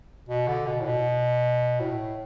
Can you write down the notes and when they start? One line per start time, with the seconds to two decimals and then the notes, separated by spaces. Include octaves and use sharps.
0.29 B2
0.48 D3
0.67 B2
0.81 A2
0.86 B2
1.80 A2